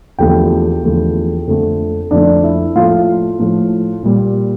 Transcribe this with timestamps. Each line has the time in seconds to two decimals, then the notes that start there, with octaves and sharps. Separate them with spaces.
0.19 E2 D3 F3 A3 G4 G5
0.83 E2 D3 F3 A3
1.47 F2 D3 F3 A3
2.11 F2 D3 F3 A3 D4 D5
2.43 E4 E5
2.75 A2 F3 A3 F4 F5
3.39 A2 F3 A3
4.03 A#2 G3